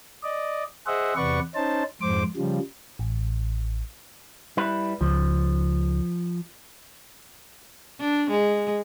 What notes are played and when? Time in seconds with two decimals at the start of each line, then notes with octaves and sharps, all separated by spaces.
0.23 D5 D#5
0.87 G#4 C5 D#5 E5 F#5
1.16 E2 C3 B4 D5 F#5 C#6
1.55 C#4 D#4 C5 A5
2.01 F2 G#2 C5 D6
2.37 C#3 F3 G3
2.99 A1
4.57 G3 E4 B4
5.01 C#2 F3
8.01 D4
8.31 G#3